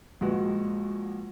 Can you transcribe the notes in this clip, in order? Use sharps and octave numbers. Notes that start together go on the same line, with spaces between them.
A#1 G#3 F#4 B4